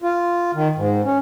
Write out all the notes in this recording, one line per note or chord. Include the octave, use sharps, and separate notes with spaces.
F4
D#3
G#2
C#4